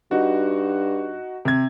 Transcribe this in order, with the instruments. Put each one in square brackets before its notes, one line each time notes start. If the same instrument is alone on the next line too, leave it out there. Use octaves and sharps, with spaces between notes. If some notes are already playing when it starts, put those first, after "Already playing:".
[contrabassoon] G2 [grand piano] D#4 F#4
[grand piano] C3 G#6